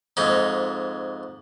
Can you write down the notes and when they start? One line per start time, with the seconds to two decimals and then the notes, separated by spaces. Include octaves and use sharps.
0.17 F2 G#2 D#4